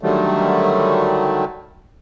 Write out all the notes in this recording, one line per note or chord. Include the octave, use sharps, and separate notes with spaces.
D3 D#3 F#3 G3 A3